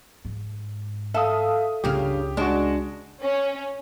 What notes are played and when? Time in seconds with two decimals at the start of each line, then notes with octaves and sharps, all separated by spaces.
0.25 G#2
1.14 A4 E5 F5 D#6
1.84 C#2 G2 C#3 C#4 G4 F5
2.37 G#3 D4 F#4
3.21 C#4